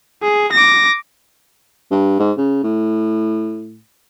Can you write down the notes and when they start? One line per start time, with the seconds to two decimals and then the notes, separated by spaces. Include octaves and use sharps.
0.23 G#4
0.52 D6 A#6
1.91 G2
2.20 G#2
2.37 C#3
2.63 A2